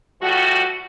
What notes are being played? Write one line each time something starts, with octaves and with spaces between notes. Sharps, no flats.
F3 G3 A3 F#4